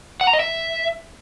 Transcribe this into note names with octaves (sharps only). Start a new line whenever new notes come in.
F#5
A#5
D#5
E5